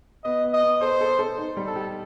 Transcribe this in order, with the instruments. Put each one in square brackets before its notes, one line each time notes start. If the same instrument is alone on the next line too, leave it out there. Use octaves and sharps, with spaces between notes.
[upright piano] B3 [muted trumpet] D#5
[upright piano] B3
[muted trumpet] D#5
[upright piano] B3
[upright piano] A4 [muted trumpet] C5
[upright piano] A4
A4
D#4
G3
[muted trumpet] A4
[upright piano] G4